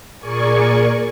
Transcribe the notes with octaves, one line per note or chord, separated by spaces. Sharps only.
A#2 G#4 A#4 D5 G#5 C#6